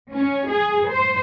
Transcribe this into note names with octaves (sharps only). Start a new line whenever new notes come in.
C#4
G#4
C5